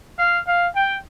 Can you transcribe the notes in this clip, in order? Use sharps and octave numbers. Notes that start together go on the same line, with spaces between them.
F5
F5
G5